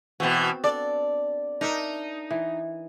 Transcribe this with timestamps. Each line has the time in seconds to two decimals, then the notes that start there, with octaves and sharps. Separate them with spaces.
0.20 B2 E3 B3 C4 F#4
0.64 D4 A4 D5
1.61 D4 D#4 A#4 E5
2.31 E3